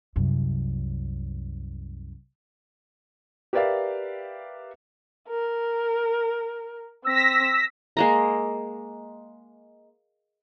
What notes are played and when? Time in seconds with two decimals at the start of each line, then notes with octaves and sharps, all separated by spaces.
0.16 C2 F#2
3.53 G4 A#4 B4 D5 E5 F5
5.29 A#4
7.04 C4 E6 A#6 B6
7.97 G#3 A#3 A#5